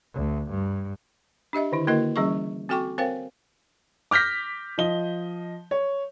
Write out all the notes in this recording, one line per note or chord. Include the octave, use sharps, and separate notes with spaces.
D2
G2
D4 G4 D#5 E5
D3 D#3 E4
D3 A#3 E4 F#4 A#4 D#5
E3 G3 C#4 G#4 D#5 C#6
C4 F#4 A4 G5 C#6 D6
C4 A#4 C5 C#5 F5 G5
D6 F6 G6 A#6 B6
F3 D#5 G7
C#5